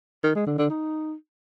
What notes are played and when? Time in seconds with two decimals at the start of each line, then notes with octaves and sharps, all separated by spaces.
0.24 D#3
0.35 G#3
0.47 D3
0.58 D3
0.70 D#4